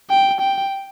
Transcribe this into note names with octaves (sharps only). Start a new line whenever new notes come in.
G5
G5